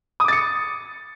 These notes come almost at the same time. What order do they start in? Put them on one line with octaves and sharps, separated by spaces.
D#6 D6 A6 C#7